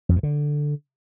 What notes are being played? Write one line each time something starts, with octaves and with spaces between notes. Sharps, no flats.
F2
G2
D3